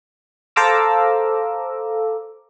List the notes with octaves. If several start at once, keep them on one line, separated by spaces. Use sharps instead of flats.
A4 C5 F5 A#5 D6 E6